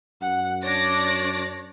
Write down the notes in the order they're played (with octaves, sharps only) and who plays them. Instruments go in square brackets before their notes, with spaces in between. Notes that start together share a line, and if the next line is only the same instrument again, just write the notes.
[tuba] F#2 [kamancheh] F#5
[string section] D4 D5 A#6 [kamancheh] C#5